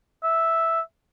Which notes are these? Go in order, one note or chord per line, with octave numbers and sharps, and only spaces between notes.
E5